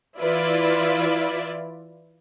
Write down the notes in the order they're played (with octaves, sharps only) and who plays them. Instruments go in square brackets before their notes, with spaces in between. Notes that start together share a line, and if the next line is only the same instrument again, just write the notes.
[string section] E3 E4 F4 B4 D5 E5